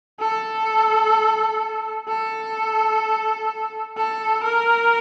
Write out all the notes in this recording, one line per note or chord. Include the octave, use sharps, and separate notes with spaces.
A4
A4
A4
A#4